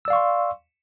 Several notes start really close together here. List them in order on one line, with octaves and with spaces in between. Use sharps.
E6 D5 F5 C#6 C6